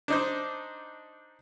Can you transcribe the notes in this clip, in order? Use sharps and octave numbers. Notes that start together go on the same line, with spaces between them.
D4 D#4 C5